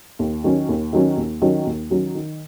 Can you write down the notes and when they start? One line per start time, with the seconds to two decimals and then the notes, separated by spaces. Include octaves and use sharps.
0.19 D#2
0.44 D#3 F#3 C#4
0.69 D#2
0.93 D#3 F#3 C#4
1.17 D#2
1.42 D#3 F#3 C#4
1.66 D#2
1.90 D#3 F#3 C#4
2.15 D#3